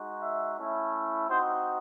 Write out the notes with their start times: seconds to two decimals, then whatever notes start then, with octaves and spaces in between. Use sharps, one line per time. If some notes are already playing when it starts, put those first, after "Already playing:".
Already playing: G#3 D#4 F#4
0.22 E5
0.57 A3 C#4 E4
1.28 C4 D#4 F#4 C5